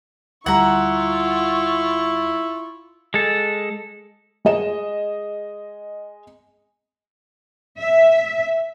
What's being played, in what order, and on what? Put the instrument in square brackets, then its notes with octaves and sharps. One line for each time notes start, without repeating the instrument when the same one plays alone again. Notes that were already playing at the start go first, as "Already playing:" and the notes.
[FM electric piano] D2 G3 [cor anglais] E4 [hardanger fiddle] F4 C#6 [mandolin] F#5 A#5
[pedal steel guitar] G#3 A4
[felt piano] G#3 G#4 D#5 E7
[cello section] E5